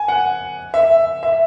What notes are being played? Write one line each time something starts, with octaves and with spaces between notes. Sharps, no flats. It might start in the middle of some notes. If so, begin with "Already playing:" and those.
Already playing: G#5
F#5
E5
E5